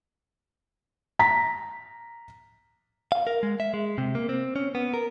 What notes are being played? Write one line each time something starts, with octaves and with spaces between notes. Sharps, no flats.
A#5 B6
F5
A#4
G#3
E5
G#3
C3
A#3
C4
C#4
B3
A#4